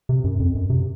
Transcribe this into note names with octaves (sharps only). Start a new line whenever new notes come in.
C3
F#2
F2
F#2
C3